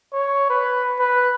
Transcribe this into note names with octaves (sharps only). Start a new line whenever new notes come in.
C#5
B4
B4